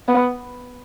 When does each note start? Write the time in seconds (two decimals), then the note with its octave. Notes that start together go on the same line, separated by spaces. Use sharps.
0.08 B3